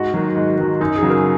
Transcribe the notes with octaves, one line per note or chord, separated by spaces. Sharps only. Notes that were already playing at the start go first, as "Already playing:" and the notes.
Already playing: G#2 F#4
D#3 F#3
G#2
D#3 F#3
F#2 D#4
G#4
C#3 F#3
A#4